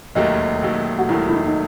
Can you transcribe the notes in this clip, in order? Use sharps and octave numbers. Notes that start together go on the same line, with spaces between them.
E1 D#2 D#3 F#3 A3 D#5
E1 D#2 D#3 F#3 A3
F#4
E1 D#2 D#3 F#3 A3 E4
E4
D#4
D#4